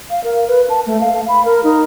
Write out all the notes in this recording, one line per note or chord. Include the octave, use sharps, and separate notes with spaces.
F5
A#4
B4
A5
A3
F5
B5
A#4
D#4